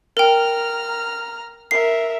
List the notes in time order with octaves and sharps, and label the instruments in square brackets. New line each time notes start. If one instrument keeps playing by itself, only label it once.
[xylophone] A#4 G5 [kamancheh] A#5 F6
[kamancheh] A#4 E5 [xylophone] C7